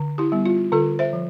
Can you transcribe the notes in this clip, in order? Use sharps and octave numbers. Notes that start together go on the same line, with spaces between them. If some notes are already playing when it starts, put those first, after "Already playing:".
Already playing: D3
E4 G4
G3 B3
F4
D3 F4 A4
C5 E5
F3